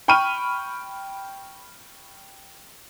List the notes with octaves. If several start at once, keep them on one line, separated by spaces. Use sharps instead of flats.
G5 B5 C#6 F6 D#7